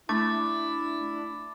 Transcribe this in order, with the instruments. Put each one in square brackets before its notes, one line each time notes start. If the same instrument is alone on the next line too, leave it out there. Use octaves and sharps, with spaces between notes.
[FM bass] A3 [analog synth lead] D4 [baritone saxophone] E4 [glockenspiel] D6 A6